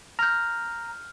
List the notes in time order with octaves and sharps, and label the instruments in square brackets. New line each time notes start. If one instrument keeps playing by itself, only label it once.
[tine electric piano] A#5 [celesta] F6 G6